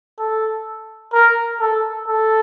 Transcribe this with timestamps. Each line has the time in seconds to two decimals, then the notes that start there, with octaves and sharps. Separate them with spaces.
0.19 A4
1.13 A#4
1.60 A4
2.08 A4